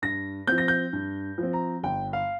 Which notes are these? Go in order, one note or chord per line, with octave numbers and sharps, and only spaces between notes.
G2 A#6
F3 C4 G6
A#6
G6
G2
F3 C4
A#5
G1 G5
F5